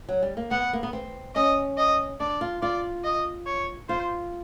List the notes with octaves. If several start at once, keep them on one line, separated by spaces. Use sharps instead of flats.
F#3
G3
A#3
B3 F#5
A#3
B3
C4
C#4 D#5
D#5
D4 D5
F4
F4 D5
D#5
C#5
F4 C5